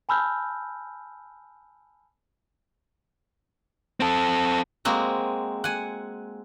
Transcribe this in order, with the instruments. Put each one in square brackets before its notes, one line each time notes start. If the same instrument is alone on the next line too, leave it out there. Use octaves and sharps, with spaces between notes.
[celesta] G#5 A5 B5 E6 F6 G6
[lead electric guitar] C4 A4
[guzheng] G#3 A#3 C4 F#4
F#5 G#5